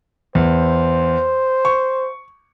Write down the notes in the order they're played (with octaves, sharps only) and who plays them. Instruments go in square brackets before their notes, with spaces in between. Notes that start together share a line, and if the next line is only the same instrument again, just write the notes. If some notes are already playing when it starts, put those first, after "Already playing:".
[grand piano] E2 [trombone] C5
[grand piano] C#6